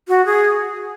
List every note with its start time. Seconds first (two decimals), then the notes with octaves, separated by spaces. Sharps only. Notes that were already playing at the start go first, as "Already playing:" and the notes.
0.08 F#4
0.26 G#4